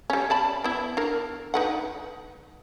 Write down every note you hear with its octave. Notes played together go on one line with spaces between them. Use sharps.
G3 C#4
D5 A5 B5
B3 E4
D4 A#4
D#4 B4 F#5